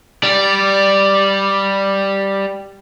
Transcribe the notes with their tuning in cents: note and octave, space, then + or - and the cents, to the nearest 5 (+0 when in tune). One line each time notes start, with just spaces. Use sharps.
G3 +0 D5 +0